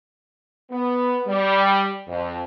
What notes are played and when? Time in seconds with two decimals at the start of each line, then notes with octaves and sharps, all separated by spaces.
0.70 B3
1.26 G3
2.07 F2